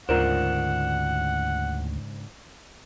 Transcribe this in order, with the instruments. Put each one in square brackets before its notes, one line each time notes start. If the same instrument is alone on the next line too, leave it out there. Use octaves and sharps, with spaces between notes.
[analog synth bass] D2 [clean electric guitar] G#2 C#3 D4 [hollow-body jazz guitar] F4 A#4 C5 [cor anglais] F#5